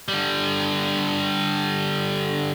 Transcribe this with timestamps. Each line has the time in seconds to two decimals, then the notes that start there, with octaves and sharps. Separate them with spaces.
0.08 D3 G3